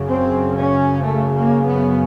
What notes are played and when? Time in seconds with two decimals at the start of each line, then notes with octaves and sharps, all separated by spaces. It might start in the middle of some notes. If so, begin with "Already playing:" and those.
Already playing: F#2 C#3
0.10 C4
0.57 C#4
1.04 A3
1.34 A#3
1.66 B3